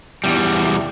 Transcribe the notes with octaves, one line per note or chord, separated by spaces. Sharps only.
E2 G3